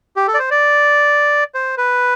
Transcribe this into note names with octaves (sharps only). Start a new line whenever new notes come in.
G4
A4
D5
C5
D5
C5
B4